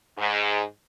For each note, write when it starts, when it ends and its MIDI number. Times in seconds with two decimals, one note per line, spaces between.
0.18 0.61 44